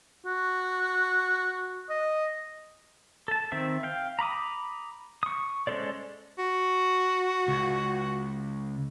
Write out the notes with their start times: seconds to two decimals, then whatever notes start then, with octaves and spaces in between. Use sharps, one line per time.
0.26 F#4
1.90 D#5
3.28 A4 A5
3.52 D#3 C4 E5
3.83 F5 G5
4.19 A#5 B5 D6 D#6
5.23 C#6 D#6
5.67 G#3 C#4 A4 C5 D5
6.39 F#4
7.48 C#2